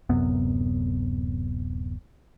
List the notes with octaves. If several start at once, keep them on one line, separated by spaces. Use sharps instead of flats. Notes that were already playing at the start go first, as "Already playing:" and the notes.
D1 F#2 C3 B3